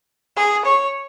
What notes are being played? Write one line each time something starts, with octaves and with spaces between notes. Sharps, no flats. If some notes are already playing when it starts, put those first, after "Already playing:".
G#4
C#5